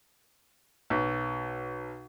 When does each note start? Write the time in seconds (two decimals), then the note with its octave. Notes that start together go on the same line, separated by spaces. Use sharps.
0.90 B1